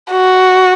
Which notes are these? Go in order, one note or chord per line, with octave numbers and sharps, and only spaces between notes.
F#4